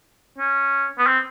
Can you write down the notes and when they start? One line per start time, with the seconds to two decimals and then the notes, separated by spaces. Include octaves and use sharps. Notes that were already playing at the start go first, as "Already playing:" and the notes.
0.38 C#4
0.98 B3
1.07 C4